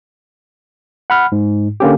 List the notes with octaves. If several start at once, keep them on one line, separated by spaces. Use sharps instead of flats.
F#5 B5 F6
G#2
D3 A#3 C#4 G4